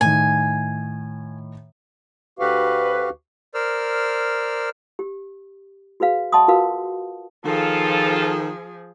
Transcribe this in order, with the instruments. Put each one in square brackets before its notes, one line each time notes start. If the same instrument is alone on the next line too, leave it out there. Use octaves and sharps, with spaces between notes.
[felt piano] A2 D#3 [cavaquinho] G#5
[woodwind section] D2 B4 [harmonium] F#4 G4 F5
[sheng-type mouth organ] A#4 C5 D5 E6 F6
[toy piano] G4
F#4 G#4 B4 F5
D#5 F#5 A5 C6 C#6 D#6
F4 F#4 A#4 B4 F5
[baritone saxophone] D#3 [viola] F3 G#4 [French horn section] F4 A4